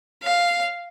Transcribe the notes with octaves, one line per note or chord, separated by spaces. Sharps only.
F5